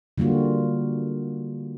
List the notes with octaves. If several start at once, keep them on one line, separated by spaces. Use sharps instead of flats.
D3 G3 A#3 F4 F#4